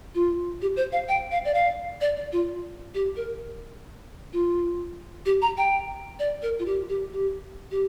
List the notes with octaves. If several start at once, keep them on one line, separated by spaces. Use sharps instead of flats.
F4
G4
C5
F5
G5
F5
D5
F5
D5
D5
F4
G4
A#4
F4
G4
A#5
G5
D5
A#4
F4
G4
G4
G4
G4